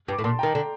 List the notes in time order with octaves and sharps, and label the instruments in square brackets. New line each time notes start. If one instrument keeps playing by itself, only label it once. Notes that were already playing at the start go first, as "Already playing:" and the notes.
[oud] G2
[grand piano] D6
[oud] A2
[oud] A#2 [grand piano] A5 C6
[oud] D#3 [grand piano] G5 A#5
[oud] D3